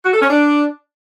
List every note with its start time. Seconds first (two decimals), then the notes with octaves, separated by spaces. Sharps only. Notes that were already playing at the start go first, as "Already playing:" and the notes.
0.05 F#4
0.13 A4
0.22 C#4
0.30 D4